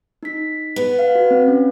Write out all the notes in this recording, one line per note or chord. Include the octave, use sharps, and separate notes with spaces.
D#4 B6
B3
F5
F#4
C4
C#4